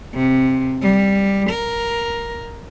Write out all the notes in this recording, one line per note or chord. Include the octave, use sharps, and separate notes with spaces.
C3
G3
A#4